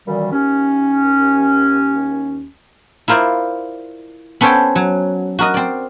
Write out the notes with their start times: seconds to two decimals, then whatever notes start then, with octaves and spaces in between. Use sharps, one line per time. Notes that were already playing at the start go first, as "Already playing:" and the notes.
0.06 F#2 A#2 D#3 E3 G3
0.32 D#2 C#4
3.08 E4 F4 A#4 C5 D5
4.41 B3 C#4 A4 C5 C#5 G5
4.76 F#3
5.39 F#4 A#4 D#5
5.54 C4 D5